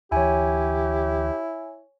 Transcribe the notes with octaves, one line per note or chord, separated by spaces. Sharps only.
D2 E3 E4 G4 C#5 G#5